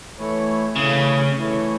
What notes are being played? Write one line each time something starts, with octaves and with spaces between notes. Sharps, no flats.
E3 A3 E4 C#5
C#3 E3 A3 E4 C#5
E3 A3 E4 C#5